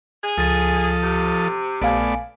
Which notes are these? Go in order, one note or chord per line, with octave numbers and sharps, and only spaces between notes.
G#4
C#2 F3 A4 D#6 A6
C3
A#1 A3 B3 D5 F5 G#5